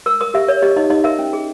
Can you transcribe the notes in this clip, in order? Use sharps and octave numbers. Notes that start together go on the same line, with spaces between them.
A#4 E6
A#4 D#6
G4 E5
A#4 C#5
G4 D#5
D#4 D#5
D#4 D#5
A#4 E5
C#4
G#4